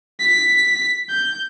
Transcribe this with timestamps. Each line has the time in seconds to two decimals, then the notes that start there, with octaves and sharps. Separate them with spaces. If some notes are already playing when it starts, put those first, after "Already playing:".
0.20 B6
1.09 G6